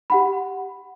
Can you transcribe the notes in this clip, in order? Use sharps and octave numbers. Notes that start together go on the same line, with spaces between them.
G4 F#5 B5